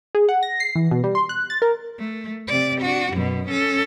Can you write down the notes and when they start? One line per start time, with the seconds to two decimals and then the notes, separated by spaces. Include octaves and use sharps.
0.15 G#4
0.29 F#5
0.43 A#6
0.60 C7
0.75 E3
0.91 B2
1.04 G3
1.15 C6
1.29 F#6
1.50 A6
1.62 A#4
1.98 A3
2.47 C3 D5
2.81 D4 F#4
3.12 F#2 B2
3.48 C#4 A4